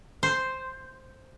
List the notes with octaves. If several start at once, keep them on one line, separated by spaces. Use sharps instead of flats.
C5